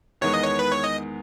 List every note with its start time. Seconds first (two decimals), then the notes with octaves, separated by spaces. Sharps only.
0.21 E2 D#3 G#3 B3 C#5
0.34 D#5
0.44 C#5
0.59 B4
0.72 C#5
0.84 D#5